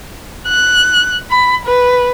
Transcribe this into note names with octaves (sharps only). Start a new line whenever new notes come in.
F#6
B5
B4